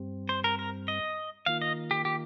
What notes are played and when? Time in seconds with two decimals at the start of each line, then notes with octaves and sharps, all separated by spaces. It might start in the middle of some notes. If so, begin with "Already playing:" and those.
Already playing: G2 G3 C4
0.29 C5
0.44 A#4
0.59 A#4
0.88 D#5
1.46 D#3 A#3 F4 F5
1.62 D#5
1.91 G4
2.05 G4